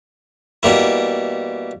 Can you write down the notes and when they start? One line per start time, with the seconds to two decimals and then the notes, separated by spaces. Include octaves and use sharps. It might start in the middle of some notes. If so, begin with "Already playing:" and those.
0.63 B2 G3 A#3 E4